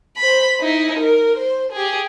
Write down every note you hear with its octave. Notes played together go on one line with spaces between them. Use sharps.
C5 B5
D#4 E4
A#4
C5
G4 G#4